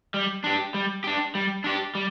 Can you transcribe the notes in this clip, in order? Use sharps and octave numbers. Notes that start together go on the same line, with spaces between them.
G3
D4 G4
G3
D4 G4
G3
D4 G4
G3